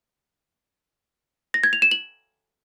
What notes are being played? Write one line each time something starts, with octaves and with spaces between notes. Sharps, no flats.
A#6
G#6
F7
E7
F#7